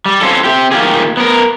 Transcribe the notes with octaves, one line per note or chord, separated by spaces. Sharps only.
G3
C4 C#4 F4 A4
C4 G4
A#2 D#3 F4 G4 G#4
B3 A#4